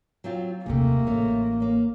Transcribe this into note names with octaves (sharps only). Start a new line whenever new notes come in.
F#3 C4 F4
D#1 C3 A3 A#3 G4 G#4
A1 A3 C#5
A#3 C#4